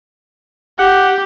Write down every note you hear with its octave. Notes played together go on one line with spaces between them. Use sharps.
G4 F#5